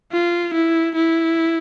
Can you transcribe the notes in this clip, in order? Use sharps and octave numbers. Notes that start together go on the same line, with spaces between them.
F4
E4
E4